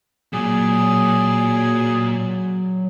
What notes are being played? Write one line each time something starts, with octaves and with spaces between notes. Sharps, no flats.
A#2 F#3 G#4